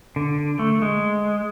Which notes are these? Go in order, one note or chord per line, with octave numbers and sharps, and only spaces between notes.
D3
A3
G#3